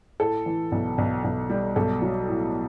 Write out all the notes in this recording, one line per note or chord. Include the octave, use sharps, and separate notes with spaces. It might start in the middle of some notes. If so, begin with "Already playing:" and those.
A2 A4
E3
B1
B1
B1
G3
B1 A4
F#3
A2